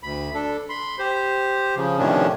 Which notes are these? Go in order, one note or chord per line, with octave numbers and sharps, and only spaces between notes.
D2 B5
D4 A4
B5 C6
G4 C5
C#3 F3
A2 C3 D#3 F3 C#4 D4